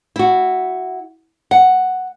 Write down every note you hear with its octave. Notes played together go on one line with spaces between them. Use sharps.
E4 F#4
F#5